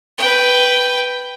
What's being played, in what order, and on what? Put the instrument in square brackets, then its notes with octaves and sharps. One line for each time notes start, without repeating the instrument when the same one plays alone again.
[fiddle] B4 G5